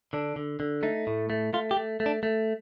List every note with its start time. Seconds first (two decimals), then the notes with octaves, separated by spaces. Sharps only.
0.13 D3 D4
0.36 D3
0.60 D3
0.83 A3 D#4
1.07 A2
1.30 A3
1.53 A3 F4
1.71 G4
1.77 A3
2.00 A3
2.06 D4
2.23 A3